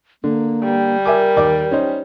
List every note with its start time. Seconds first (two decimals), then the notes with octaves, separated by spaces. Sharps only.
0.24 D3 A#3
0.64 G3
1.05 A#4 E5 G#5 D6
1.37 D#2 D5 D6
1.71 C#4 D#4 C5